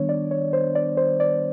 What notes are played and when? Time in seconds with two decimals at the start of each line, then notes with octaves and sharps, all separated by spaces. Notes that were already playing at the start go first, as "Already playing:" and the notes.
Already playing: D#3 G3 B3 D4 C#5
0.09 D5
0.31 C#5
0.53 C5
0.75 D5
0.97 C5
1.20 D5